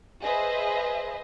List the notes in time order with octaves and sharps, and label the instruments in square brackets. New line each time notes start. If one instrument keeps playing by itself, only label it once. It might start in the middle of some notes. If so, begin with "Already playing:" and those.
[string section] G#4 B4 C5 D#5 E5